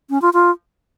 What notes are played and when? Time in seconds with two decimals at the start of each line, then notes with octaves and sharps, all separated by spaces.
0.10 C#4
0.22 F4
0.33 F4